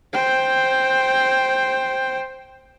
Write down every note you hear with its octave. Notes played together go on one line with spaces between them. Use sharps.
C5 G5